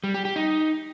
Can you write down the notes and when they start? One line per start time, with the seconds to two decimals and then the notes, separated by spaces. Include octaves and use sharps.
0.04 G3
0.14 G4
0.25 G4
0.36 D#4